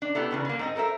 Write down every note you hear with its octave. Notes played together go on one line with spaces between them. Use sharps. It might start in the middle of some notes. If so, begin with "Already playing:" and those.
D4
A3 B3 E4 G4
E2 C#3 B3
D3 A#3
G#2 C4 D#5
A4 A#4 C5 E5